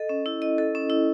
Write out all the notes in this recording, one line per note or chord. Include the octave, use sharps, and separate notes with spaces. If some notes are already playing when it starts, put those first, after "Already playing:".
Already playing: A4 D#5
C#4
E4
D#5
A4
C#4
E4